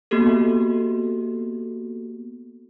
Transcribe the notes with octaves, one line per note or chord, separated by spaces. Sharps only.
A#3 B3 F#4 G4 A4